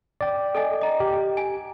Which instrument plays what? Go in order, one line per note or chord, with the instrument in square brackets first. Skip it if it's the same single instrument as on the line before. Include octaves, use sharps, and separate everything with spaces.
[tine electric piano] D5 G5
[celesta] A4 D#5 G#5
D#5 A#5
[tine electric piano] G4
[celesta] G#5